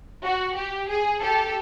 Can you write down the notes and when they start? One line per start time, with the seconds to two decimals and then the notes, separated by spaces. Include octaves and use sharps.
0.24 F#4
0.56 G4
0.89 G#4
1.22 G4 A4